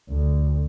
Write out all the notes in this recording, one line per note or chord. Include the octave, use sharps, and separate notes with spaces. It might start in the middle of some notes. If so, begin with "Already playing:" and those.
D2